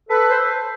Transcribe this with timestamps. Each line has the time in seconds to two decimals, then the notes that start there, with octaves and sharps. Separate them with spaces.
0.09 A4 B4
0.28 C5